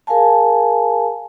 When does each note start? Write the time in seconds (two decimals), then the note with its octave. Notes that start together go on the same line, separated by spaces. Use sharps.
0.07 G#4 A#4 F5 G#5 A5